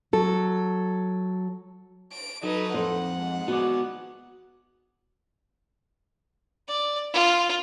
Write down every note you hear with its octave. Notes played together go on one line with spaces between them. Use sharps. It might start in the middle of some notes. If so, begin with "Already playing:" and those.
F#3 A4
D7
F#3 D#4 A4 B4
F2 C5 F#5
G#2
B3 F#4 D5
D5
F4